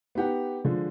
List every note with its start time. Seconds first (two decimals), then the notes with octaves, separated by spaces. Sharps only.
0.15 B3 D#4 G4 F#5
0.65 D3 F3 G#3